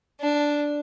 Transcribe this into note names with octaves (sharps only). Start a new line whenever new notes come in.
D4